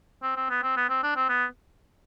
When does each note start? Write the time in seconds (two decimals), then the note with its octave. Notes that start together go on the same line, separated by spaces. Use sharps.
0.22 C4
0.36 C4
0.50 B3
0.63 C4
0.77 B3
0.89 C4
1.03 D4
1.16 C4
1.29 B3